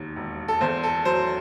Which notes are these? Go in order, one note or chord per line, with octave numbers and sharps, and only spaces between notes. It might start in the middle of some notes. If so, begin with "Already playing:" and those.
Already playing: E1 D#2 D#3
E1
A4
E2 C5
A4
F#3 C5